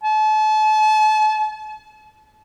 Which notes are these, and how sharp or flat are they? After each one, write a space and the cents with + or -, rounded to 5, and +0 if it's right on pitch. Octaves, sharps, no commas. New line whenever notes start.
A5 -35